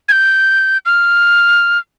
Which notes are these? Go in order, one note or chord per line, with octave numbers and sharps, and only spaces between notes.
G#6
G6
F6